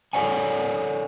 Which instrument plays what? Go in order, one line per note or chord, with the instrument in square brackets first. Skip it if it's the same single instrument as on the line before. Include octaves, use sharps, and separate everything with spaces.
[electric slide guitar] A4 A#4 C#5 D5 F#5 G#5